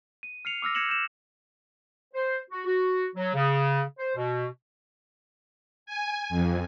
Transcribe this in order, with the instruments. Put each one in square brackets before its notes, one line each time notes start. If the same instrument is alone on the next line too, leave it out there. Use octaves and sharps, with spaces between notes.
[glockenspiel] D#7
F6 C7 C#7 F7
D6 E6 F6 A#6
F#6 G#6 A#6 C#7 E7 F#7
G6 C#7 E7
[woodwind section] C5
F#4
F#4
F#3
C#3
C5
B2
[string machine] G#5
F2